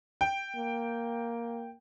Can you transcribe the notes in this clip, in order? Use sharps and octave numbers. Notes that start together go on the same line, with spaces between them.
G5
A#3